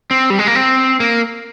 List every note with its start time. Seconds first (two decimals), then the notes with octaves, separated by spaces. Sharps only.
0.11 C4
0.30 G3
0.39 G#3
0.47 A#3
0.55 C4
1.00 A#3